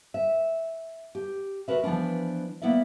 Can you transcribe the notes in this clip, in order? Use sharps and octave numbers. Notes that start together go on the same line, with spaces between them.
E5
G4
F#4 G#4 A#4 B4 E5
E3 F3 B3 D4
A#3 B3 E4 D5 E5